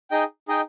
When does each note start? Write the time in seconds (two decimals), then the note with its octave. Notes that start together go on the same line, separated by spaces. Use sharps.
0.11 D#4 G#4 D#5 G5
0.48 D#4 G#4 D#5 G5